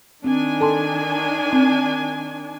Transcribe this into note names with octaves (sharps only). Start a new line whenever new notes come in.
D#3 C4 D4 G#5
A4 A5 C6
C4